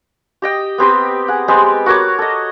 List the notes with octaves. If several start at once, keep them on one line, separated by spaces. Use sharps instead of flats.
G4 D#5 G5
B3 C4 G4 C5
G#4 F#5
G#3 B3 C4 G4
F#4 A#4 C#5 D6
A4 D#5